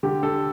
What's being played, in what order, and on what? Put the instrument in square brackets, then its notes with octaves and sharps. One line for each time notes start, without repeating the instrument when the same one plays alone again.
[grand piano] D3 G4
D3 A4